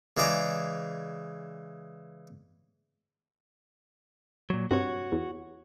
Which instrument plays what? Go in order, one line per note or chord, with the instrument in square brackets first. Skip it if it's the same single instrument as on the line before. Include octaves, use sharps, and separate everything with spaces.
[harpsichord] C#3 E3 G#3 D5 A#5
[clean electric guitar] A#2 F#3
[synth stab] G2 C3 [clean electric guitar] F#4 C#5
[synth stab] E2